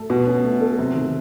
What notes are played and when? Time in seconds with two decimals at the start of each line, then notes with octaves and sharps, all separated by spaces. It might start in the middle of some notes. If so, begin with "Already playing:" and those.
Already playing: A3 A4
0.10 B2 F#4
0.27 C#4
0.44 A3
0.61 A4
0.77 C3 F#3
0.95 D#3